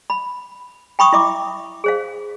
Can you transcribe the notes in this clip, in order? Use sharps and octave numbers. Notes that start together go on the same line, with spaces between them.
B5
G5 B5 C#6 D#6
E4 E5 D6
G#4 C5 F5